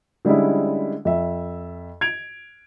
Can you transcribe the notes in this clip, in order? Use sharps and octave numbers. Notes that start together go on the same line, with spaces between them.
D3 G3 G#3 C#4 D#4 E4
F2 E5
G#6 D7 F7